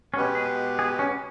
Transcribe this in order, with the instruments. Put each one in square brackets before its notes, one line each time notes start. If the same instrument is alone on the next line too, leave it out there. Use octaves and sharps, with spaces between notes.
[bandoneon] B2 G#3 B3 G4 B4 [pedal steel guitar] C#4
[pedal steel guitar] G#4
G#4
C#4